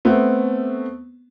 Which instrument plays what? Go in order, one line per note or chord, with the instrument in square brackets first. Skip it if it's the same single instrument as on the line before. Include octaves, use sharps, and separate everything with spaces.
[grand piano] A3 B3 C4